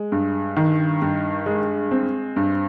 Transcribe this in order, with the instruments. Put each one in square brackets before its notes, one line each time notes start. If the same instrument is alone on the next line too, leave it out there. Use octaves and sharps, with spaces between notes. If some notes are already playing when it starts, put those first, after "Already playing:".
Already playing: [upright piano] G#3
G2
D#3
G2
G#3
C4
G2